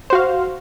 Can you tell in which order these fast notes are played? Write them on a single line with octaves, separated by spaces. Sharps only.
C5 F#4 F5